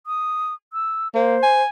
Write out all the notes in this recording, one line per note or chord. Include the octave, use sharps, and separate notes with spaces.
D#6
E6
A#3 C5
G#5